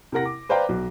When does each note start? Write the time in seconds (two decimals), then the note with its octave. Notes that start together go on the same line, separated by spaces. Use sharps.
0.12 C3 E4 A#4 F#5 A#6
0.25 D6
0.49 B4 C5 D5 F5 G5 A#5
0.69 B1